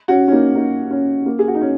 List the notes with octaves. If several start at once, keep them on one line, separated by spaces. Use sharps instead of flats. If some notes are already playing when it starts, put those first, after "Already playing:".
C#4 F#4
C#4
A#3 D#4
A#3 D#4
C#4
A#3
G#4
F#4
D#4
C#4